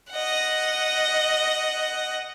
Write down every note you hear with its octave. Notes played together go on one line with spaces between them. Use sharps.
D#5 F#5